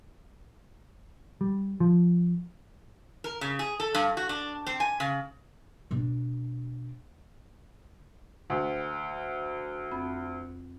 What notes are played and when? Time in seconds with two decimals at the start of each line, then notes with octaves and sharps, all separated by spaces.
1.41 G3
1.80 F3
3.24 A#4
3.41 C#3
3.59 G#4
3.80 A4
3.94 G2
4.17 F#4
4.29 D4
4.66 C4
4.80 G#5
5.00 C#3
5.91 B2 D4
8.50 D2
9.92 F2 C4 B5